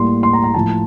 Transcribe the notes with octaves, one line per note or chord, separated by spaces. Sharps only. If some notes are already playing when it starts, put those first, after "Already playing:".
Already playing: A2 G3 A#3 C6
C6
A#5
A#5
A2 F3 A3 A5